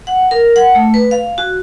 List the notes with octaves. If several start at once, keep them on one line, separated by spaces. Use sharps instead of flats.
F#5
A#4
F#5
A3
B4
F5
F#4